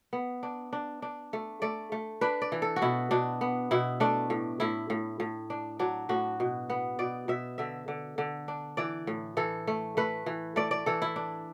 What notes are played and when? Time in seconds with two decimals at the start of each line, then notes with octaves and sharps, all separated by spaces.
0.13 B3
0.43 D4
0.73 D4
1.02 D4
1.33 A3
1.62 A3 D5
1.92 A3
2.21 D4 B4
2.42 D5
2.52 E3
2.62 A4
2.76 F#4
2.82 B2 E4
3.11 B2 D4
3.41 B3
3.71 B2 E4
4.00 A3 D4
4.30 A2
4.60 A2 E4
4.90 A2
5.20 A2
5.50 D4
5.79 F#3 D4
6.09 A2 F#4
6.40 B2
6.70 B3
6.99 B2 D5
7.28 B2 E5
7.58 D3 E5
7.88 D3
8.18 D3
8.48 D4
8.77 E3 D5
9.07 A2
9.37 E3 A4
9.67 A3
9.97 A3 B4
10.26 E3
10.56 A3 D5
10.71 D5
10.86 E3 A4
11.02 E4
11.16 D4